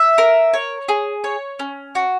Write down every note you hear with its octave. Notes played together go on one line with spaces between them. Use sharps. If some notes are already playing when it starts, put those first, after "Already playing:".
Already playing: E5
A#4
C#5
G#4
C#5
C#4
F#4